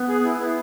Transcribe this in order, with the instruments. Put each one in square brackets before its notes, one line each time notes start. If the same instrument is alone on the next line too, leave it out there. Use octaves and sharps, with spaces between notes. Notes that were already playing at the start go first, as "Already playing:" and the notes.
Already playing: [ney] B3
[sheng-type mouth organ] G#4
E4
B3